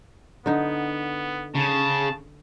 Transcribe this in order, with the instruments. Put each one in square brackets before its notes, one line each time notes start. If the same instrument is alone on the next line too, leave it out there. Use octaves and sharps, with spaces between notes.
[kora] D3 D#4 [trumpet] B3
[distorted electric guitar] C#3 [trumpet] A5